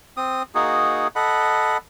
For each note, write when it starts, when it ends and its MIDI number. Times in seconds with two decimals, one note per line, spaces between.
0.17 0.43 60
0.17 0.43 87
0.55 1.07 58
0.55 1.07 63
0.55 1.07 66
0.55 1.07 68
1.16 1.78 69
1.16 1.78 75
1.16 1.78 78
1.16 1.78 83